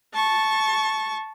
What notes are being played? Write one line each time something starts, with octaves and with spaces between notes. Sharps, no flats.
A5 C#6